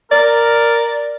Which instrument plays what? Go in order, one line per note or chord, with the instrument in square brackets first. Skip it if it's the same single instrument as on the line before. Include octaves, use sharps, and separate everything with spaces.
[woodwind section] A#4 [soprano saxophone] D5